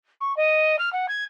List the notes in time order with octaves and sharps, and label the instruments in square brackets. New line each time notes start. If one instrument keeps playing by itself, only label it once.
[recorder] C#6
D#5
F6
F#5
G#6